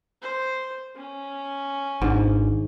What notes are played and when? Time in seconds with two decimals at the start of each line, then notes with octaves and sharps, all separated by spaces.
0.22 C5
0.96 C#4
2.02 G#1 G#2 D4